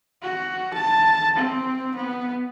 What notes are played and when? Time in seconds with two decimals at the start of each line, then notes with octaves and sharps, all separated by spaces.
0.22 F#4
0.74 A5
1.36 C4
1.96 B3